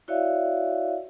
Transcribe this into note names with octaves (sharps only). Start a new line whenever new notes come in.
E4 F#4 C#5 D5 E5 F5